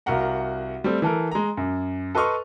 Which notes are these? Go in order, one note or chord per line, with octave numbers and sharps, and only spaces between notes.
C2 F#4 A#4 F5 F#5 A#5
G3 A3 C4
E3 A4 A#4
G#3 A#5
F#2
A4 B4 D#5 C6 C#6 F6